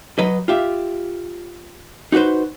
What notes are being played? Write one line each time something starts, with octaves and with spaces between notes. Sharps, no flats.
F#3 B4 D#5
F4 G4 E5
D#4 F#4 G4 B4 C5